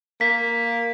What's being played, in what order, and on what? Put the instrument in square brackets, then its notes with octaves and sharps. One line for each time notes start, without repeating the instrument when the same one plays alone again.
[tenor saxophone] A#3 [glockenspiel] B6